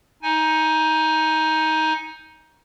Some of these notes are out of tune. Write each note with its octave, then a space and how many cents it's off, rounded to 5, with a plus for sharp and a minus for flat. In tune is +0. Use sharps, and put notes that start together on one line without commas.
D#4 +15 G#5 +0